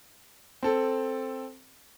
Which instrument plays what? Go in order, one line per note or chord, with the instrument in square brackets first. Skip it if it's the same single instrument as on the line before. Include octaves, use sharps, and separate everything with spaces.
[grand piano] C4 A4